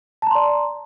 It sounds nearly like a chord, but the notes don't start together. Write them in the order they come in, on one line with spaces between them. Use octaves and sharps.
A5 A#5 C6 D5